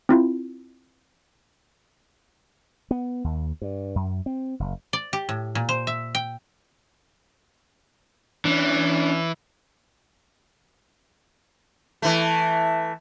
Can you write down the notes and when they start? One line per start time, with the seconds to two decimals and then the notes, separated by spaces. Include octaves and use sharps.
0.09 C4 E4 F4
2.91 B3
3.24 D#2
3.62 G2
3.95 F#2
4.26 C4
4.60 F#1
4.93 D5
5.13 G4
5.29 A2
5.55 A#2
5.69 C5
5.87 E5
6.15 G5
8.45 E3 C#4 D4
12.02 E3 A3